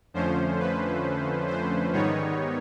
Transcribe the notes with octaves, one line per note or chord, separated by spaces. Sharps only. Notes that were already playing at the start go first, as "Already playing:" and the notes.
F2 D3 F3 A3 C#4 C5
B4
C5
G#2 D#3 G3 B3 D#4 C#5